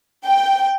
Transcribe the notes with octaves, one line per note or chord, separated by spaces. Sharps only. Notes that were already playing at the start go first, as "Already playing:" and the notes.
G5